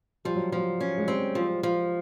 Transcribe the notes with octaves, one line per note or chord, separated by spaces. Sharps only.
F3 G3
F#3
F3 F#3
C#4
G#3
G3 C4
F3
F3